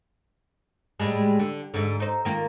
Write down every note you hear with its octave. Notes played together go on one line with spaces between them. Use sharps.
A2 G3 G#3
D3
G#2 D3
D#4 C5
D#3 A#3 F4